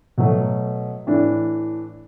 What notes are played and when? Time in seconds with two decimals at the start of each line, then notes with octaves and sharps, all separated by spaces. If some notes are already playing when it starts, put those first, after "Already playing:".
0.18 B2 F#3 A3
1.07 A2 E3 D4